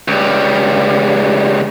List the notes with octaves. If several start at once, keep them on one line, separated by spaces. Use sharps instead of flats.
C#2 G3